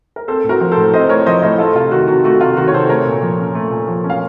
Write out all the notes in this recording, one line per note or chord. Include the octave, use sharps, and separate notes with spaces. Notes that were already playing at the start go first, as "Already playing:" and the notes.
A#4
C4 A4 C5
A2
F#4 A#4
F3
A4 C5
A2
C4 C5 D#5
A2 A#4 C#5
F3 C5 D#5
A2 C5 D#5
A3 F4 A4
C3 F4
D#3 F#4
C3 F#4
A3 F#4
C3 F4
D#3 F#4
C#5
C3 A4 C5
A3 A#4 C#5
A#2
F3
C#4
A3
A#2
F3
C#4
F5